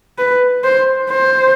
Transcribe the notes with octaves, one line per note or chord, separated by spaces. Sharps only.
B4
C5
C5